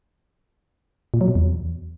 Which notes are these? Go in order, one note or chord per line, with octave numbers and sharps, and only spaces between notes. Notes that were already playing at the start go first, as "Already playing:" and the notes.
A#2
F#3
B2
E2